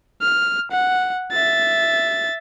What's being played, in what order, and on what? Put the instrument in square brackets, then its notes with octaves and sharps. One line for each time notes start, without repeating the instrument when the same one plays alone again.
[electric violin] F6
F#5
E5 A6